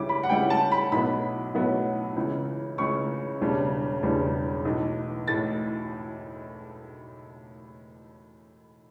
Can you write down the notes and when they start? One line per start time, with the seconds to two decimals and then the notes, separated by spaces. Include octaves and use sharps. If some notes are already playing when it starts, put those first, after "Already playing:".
Already playing: C#2 C#3 G3 C#4 E4 D6
0.09 B5
0.23 F#5
0.29 C#2 C#3 G3 C#4 E4 G5
0.50 A5
0.72 B5
0.92 B1 A2 F#3 B3 B5
1.54 B1 A2 F#3 B3
2.16 C#2 C#3 E3
2.78 C#2 C#3 E3 C#6
3.41 E1 E2 C#3 G3 D4
4.03 E1 E2 C#3 G3 D4
4.65 B1 A2 E3
5.28 A2 A6